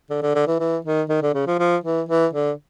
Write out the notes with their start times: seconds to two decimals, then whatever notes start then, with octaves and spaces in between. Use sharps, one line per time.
0.10 D3
0.22 D3
0.35 D3
0.47 E3
0.60 E3
0.85 D#3
1.09 D#3
1.22 D3
1.35 C#3
1.47 F3
1.59 F3
1.84 E3
2.09 E3
2.34 D3